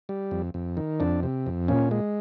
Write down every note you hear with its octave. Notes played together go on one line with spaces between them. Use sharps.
G3
F2
F2
D#3
F2 D4
C3
F2
A#2 C#4
G#3